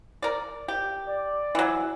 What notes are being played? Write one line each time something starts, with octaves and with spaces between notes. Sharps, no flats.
A#4 D5
G4
D5
E3 F#3